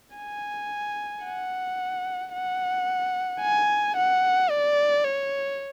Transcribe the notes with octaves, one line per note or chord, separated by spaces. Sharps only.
G#5
F#5
F#5
G#5
F#5
D5
C#5